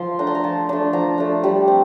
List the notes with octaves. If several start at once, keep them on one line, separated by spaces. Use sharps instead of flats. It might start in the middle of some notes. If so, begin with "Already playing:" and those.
Already playing: F3 C6
A3 D4 A#5
C6
A#5
F3 A5
A3 D4
F3 A#5
A3 D4
G3
C4